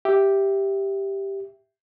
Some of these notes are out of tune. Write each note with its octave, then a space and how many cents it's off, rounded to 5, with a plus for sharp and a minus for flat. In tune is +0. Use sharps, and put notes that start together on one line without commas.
G4 +0 E5 +0